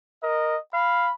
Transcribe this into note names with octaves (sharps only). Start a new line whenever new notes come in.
A#4 D#5
F5 B5